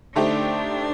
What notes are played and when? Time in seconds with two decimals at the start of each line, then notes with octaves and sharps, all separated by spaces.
0.15 D3 A3 D4 D#4 G4 C5